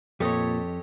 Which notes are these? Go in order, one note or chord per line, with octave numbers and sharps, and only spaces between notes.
F2 A#2 G4 A4 B4 C#5 D#5